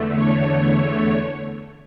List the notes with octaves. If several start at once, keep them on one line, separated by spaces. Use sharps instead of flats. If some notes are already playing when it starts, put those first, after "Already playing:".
Already playing: E2 D3 A3
C#5